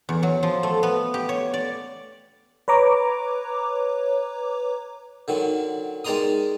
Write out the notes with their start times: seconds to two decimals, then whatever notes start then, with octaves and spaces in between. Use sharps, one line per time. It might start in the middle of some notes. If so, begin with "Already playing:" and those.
0.09 E2
0.23 F#3
0.43 F3
0.63 A3
0.83 B3
1.14 G4
1.29 C#5
1.54 D5
2.68 B4 C#5 A#5 D6
5.28 D3 D#3 F#3
6.05 D#3 G#3 D5 A#5 C6 D#6